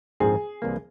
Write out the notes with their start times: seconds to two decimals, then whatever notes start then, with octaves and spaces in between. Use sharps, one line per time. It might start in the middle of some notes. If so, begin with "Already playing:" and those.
0.20 A#1 G#2 F3 C4 G#4
0.62 C2 C3 E3 A#3